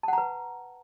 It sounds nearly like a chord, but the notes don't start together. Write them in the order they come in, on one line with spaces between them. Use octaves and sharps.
A5 F#5 A#5 B4